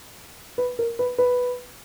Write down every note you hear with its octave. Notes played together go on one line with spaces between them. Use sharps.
B4
A#4
B4
B4